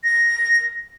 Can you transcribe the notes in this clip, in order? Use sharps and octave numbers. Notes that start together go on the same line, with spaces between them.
A#6